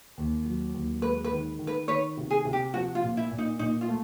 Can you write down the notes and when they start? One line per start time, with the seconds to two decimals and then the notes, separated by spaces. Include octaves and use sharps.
0.17 D#2
0.45 F#3
0.74 D#2
1.02 G#3 B4
1.25 B4
1.32 D#3
1.59 D#3
1.67 B4
1.88 D#3 B4 C#5
2.17 C3
2.31 G#4
2.45 C3
2.53 G4
2.74 F3 F#4
2.95 F4
3.03 A#2
3.17 E4
3.31 A#2
3.38 D#4
3.59 A#2 D#4
3.81 F4
3.89 A3